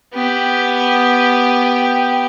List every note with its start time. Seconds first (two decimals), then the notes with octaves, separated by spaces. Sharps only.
0.14 B3 G4